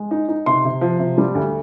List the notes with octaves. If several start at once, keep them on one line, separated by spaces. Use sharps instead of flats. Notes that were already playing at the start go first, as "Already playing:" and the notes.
Already playing: G#3
D#4
D#4
C3 C6
C3
F3
C3
G3
D2